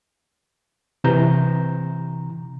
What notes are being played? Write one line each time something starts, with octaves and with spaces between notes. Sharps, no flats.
C3 E3 A#5 G6